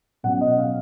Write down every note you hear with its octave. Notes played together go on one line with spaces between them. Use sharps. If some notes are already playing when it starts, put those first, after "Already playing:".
B2 F#3 C#4 F#5
D#5
F5